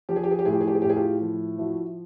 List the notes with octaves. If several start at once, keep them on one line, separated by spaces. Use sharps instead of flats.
F3 G4
G#4
G4
G#4
G4
A2 G#4
G4
G#4
G4
G#4
A2 G4
G#4
F4 G4
F3
F3 E4 F#4